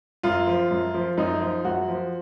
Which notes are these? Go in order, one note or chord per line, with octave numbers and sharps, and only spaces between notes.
F#2 F4
F3
F#2
F3
F#2 D#4
F3
F#2 F#4
F3